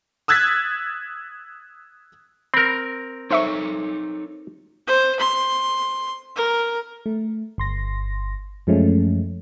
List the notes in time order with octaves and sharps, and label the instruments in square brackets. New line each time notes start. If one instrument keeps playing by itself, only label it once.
[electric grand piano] D#6 E6 F#6 G#6 A6 B6
[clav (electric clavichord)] C4 A#4 [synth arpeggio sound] B5 F6
[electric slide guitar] D#4 A4 C#5 [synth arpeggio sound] C5 E5 C#6
[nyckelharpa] C5
C6
A#4
[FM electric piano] A3
G1 C6 A#6
F#2 F3 G#3 A3 C#4